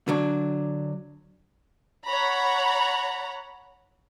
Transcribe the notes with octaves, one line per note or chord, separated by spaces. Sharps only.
D3 F#3 D4
C#5 F#5 A#5 B5